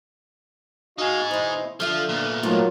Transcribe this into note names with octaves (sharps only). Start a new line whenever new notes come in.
D#4 F#4 G#4 D#5 F5
E2 B2 E4 C5 D#5
D3 F3 A4 E5 F5
A#2 B3
G#2 F#3 A3 A#3 F4